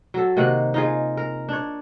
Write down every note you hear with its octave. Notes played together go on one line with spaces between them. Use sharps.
F#3 A4
C3 D#3 A#3 F#5
D#4 F4 G#4
A#4
D4 C#5